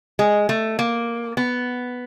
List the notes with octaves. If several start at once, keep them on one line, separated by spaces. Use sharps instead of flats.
G#3
A3
A#3
B3